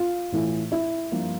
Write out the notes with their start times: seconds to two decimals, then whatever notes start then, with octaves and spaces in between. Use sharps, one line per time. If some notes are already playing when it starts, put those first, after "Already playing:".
Already playing: F4
0.32 A2 E3 A3 E4
0.72 E4
1.11 G2 F3 A#3 F4